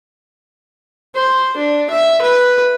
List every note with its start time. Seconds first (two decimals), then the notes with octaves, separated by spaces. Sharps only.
1.15 C5
1.57 D4
1.90 E5
2.22 B4